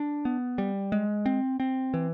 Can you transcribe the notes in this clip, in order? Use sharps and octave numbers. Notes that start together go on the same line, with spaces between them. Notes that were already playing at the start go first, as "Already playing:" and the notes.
Already playing: D4
B3
G3
G#3
C4
C4
E3